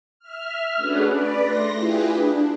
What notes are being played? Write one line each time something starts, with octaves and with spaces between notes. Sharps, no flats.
E5 F6
A3 C#4 D4 F#4 G#4 B4
B4 D5
A3 C6 A#6
E4 F4 G4 G#4 B4
D4